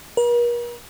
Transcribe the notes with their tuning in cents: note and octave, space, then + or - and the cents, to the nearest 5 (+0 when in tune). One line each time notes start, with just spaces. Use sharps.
A#4 +45